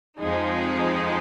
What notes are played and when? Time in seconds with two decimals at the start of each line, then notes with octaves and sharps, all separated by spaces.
0.20 F2 F3 G#3 D#4